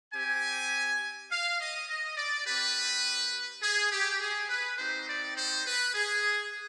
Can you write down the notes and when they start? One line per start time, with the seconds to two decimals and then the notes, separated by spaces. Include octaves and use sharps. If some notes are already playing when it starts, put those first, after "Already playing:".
0.13 C4 G4 G#5
1.30 F5
1.59 D#5
1.88 D#5
2.17 D5
2.45 C4 G4 B4
3.62 G#4
3.91 G4
4.20 G#4
4.49 B4
4.78 C4 D#4 G4 C5
5.06 D5
5.36 C5
5.65 B4
5.95 G#4